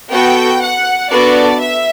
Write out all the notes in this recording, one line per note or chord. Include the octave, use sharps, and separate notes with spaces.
B3 F#4 A4 G5
F#5
B3 D4 F#4 A4 D5
E5